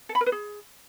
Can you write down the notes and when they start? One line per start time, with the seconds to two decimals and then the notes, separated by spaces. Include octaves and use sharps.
0.09 A4
0.15 B5
0.21 A#4
0.26 B4
0.32 G#4